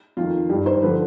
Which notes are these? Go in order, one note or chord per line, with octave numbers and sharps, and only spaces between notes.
F2 D#3 F4
G2 D#3 G4
C5
D3 F3 B4